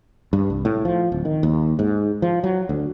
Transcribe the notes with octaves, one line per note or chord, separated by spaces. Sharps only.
G2
C2
A2
F3
D1
D#3
D#2
G#2
F3
F#3
D2